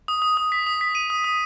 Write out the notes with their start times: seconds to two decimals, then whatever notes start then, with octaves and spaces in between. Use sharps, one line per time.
0.08 D#6
0.22 D#6
0.37 D#6
0.52 B6
0.67 D#6
0.81 B6
0.95 D#7
1.10 D#6
1.24 D#6